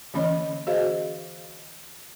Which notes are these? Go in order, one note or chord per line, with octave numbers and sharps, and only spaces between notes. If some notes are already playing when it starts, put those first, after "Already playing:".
D3 E3 A#3 C#4 C#5 D#5
F#4 G#4 C5 D#5 F5